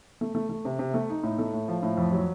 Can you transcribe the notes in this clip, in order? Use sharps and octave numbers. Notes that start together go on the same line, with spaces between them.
A3
A3
A3
C3
C3
A3
D#4
A2
A3
A2
F3
A2
F2
F#3